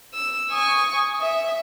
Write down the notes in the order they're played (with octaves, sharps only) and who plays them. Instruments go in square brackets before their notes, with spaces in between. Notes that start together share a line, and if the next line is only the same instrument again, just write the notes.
[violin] E6
[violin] G#5 C#6 [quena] D#6
[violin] E5